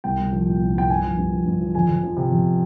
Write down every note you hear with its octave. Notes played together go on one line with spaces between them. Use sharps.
C2 G5
C2
F3
A#2
C2
C2 G5
G2 G#5
F3
G2
F3
G2
F3
F2 G#5
F2
F3
C3
F2